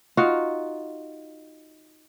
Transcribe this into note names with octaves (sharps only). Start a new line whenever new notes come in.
D#4 F4 F#4